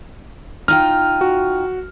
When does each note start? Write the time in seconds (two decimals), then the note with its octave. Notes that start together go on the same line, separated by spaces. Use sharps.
0.68 D#4 F4 G5 F6
1.21 F#4